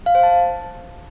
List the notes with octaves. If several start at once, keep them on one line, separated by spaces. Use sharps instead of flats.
F5
C5
A5